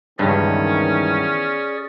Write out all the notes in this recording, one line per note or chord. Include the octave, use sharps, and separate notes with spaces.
C#2 G2 D#3 E3 B3 C#4 G#4 D5